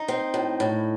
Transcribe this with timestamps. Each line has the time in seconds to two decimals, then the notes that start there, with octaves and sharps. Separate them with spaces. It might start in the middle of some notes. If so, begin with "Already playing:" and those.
Already playing: D#4
0.08 C4
0.34 A2
0.60 A2